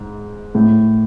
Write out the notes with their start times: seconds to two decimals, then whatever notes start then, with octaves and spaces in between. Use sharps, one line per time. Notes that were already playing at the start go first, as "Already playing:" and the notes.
Already playing: G#2
0.55 A2